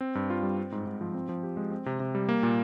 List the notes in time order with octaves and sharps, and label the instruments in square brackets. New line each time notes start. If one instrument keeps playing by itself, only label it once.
[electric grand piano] C4
G2
F4
G3
C4
G#2
G#2
F3
C4
F3
G4
G#3
C4
C3
C3
G3
A#3
A#2